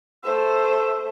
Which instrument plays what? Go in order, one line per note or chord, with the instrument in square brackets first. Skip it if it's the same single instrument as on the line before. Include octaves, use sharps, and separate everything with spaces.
[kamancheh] A3 C5 [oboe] E6